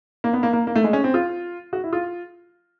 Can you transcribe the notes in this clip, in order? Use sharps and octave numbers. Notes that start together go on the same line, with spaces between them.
A#3
B3
A#3
A#3
A#3
A3
G#3
C#4
C4
F4
F#4
E4
F4